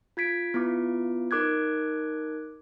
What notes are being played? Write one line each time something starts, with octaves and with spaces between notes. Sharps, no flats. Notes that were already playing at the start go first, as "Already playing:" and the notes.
F4 G#6 B6 D7
B3 E4 F4 D6
D#4 A#4 D6 F#6 G#6